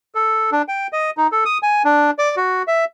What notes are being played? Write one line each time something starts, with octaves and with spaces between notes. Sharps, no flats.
A4
D4
G5
D#5
D#4
A4
D#6
G#5
D4
D5
F#4
E5